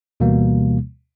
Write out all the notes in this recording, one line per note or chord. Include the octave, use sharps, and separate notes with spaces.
D2 B2 E3 G3 A#3